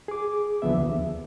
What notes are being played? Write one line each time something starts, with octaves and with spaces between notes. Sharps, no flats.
G#4 D6
C2 D3 F3 B3 E5
D#2